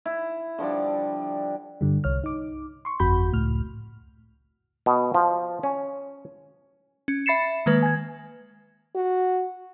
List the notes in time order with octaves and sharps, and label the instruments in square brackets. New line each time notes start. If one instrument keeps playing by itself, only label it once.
[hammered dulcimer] E4
D3 F3 G3 D4
[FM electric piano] G2 D3 G3
C2 C#5 F6
D#4 D6
C6 C#6
G1 F2 F#4 B5 G6
C#2 A2 F6
[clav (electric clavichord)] B2
F3
C#4
[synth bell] C#4
E5 B5 A6 C7 C#7 E7
D#3 G#3 A#3 B4
G#5 G#6
[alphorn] F#4